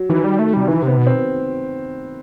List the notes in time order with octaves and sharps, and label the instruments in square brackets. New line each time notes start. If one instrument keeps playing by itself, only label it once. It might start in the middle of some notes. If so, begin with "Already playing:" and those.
Already playing: [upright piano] F#3
[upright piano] D#3 [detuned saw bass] E3
[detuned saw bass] G3
A3
[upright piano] C3 [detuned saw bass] G3
[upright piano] D#3 [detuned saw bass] E3
[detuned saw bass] C3 [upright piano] B3
[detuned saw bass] B2
[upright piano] C4